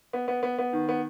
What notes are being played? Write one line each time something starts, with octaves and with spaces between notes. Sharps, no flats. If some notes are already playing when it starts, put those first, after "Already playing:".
B3
B3
B3
B3
D#3
B3